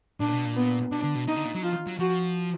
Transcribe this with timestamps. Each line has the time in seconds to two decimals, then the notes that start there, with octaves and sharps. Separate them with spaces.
0.20 A#2 D4
0.32 B2
0.45 A#2
0.56 B3
0.91 B2 D4
1.04 D3
1.15 B2
1.28 B2 D#4
1.36 D3
1.45 A#2
1.54 F#3
1.63 F3 F4
1.87 F#3
1.99 F3 F#4